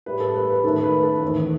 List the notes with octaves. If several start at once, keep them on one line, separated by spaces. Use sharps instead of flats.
A2 G3 B4
A4
B4
B4
D#2 D#3 A3 A4
B4
A4
E2 D#3 A3